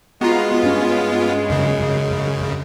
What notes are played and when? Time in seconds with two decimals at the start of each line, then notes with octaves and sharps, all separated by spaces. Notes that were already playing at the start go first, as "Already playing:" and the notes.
0.21 G#3 B3 F4 F#4 A#5 C7
0.63 G2 C#4
1.50 F#2 C#3